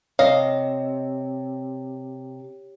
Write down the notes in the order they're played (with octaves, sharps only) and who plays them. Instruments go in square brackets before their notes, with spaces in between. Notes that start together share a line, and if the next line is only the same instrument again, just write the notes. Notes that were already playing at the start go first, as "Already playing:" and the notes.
[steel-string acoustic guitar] C3 [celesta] C#5 [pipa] D#5 [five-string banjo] F5